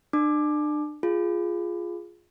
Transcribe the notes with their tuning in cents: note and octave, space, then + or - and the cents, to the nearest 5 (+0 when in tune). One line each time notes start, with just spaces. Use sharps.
D4 +35 D6 +15
F4 +0 G#4 +0